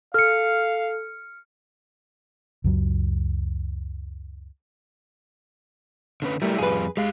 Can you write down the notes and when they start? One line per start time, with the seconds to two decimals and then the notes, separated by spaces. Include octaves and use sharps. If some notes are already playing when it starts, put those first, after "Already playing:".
0.14 A4 F5 F6 C#7
2.64 C#2 F#2 F#3
6.22 D3 C#4 B4
6.42 F#3 G3 A3 E4 A#4
6.58 F2 G3 F4 G#4 B4
6.97 G#3 G4 F5